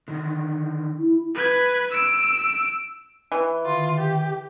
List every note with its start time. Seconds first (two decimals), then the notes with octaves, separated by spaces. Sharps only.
0.08 D3 D#3
0.98 E4
1.34 B4 G#6
1.90 E6 D7
3.32 E3
3.65 D3 D#3 F4
3.98 G4